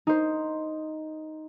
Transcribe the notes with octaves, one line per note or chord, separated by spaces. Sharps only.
D#4 C5